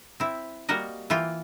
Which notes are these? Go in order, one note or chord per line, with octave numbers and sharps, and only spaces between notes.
C4 E4
G3 A#3 F#4 A#4 D#5
E3 A#3 F4 G5